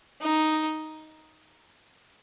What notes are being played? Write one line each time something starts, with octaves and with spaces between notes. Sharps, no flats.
D#4